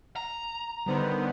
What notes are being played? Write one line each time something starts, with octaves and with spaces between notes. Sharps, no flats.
A#5
D3 D#3 G3 B3 C5